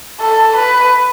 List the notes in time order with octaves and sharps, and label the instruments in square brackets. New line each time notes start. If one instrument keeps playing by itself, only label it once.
[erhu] A4
B4